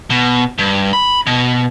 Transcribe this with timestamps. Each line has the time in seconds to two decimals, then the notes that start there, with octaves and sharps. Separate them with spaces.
0.10 B2
0.58 G2
0.93 B5
1.27 B2